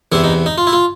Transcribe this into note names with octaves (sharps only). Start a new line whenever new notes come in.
E2 C3 E3 E4
D#4
D#4
F4
E4
F4